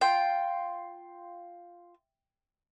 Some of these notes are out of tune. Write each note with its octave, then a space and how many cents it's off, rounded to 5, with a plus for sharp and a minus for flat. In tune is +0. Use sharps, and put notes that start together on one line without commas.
F4 +0 G5 +0